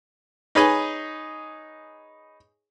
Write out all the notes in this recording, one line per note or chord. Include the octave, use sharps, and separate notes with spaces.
D#4 G#4 B4 C#5 D#5 G#5